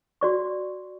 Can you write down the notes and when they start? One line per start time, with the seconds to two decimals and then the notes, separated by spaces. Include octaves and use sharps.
0.21 F#4 D5 C#6